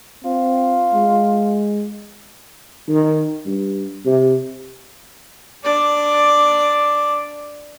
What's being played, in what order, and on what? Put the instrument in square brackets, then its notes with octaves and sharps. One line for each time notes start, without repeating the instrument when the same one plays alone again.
[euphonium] C4 [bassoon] F4
[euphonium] G#3
[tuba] D#3
G2
C3
[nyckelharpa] D4 D5